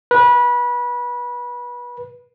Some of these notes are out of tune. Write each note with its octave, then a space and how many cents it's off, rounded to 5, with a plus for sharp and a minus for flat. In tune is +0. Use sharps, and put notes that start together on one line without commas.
B4 -25